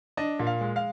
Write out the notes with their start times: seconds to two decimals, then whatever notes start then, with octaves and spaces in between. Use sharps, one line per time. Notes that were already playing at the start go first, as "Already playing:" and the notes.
0.17 D4 D#5
0.39 A#2
0.47 F5
0.61 G#3
0.76 F5